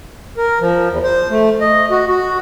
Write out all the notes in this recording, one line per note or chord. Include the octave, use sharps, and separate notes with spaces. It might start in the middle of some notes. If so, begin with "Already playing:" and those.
A#4
F3
E2
C5
A3
D#5
F#4
F#4